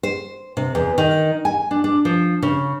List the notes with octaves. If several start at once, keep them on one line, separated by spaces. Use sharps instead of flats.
C5
C3
E2
D#3
G#5
D4
D4
F3
C#3